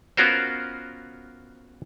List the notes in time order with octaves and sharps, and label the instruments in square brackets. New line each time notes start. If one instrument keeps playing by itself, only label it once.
[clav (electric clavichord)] B3 C#4 F4 F#4 A#4 C5